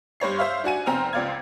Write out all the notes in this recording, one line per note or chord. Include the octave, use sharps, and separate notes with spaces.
G2 C5 C#5 C7
C5 E5 F5
D4 F#4 G#5 D#7
F1 C4 A#5 F6
C#2 C4 D5 F5 G#6